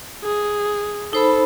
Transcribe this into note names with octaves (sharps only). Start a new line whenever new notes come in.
G#4
D#4 A4 C5 B5